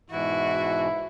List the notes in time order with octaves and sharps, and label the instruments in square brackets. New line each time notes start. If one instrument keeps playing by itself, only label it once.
[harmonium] G#2 B2 E3 [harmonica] E4 [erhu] F#4